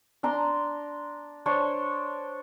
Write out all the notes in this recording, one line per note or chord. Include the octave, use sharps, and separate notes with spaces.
D4 A#5 C6
D4 C5 C#5